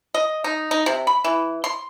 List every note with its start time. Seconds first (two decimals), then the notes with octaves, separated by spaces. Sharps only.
0.14 D#5
0.44 D#4
0.71 D#4
0.86 C3
1.07 B5
1.24 E3
1.64 C6